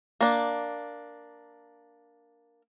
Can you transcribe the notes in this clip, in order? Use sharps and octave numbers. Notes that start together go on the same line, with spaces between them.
A#3 D4